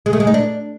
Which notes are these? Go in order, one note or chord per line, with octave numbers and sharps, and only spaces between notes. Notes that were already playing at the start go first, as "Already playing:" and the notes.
G#3
A3
G#3
D#4
D4